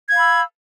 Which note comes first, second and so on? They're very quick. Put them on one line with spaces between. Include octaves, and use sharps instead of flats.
G#6 F5 B5 E6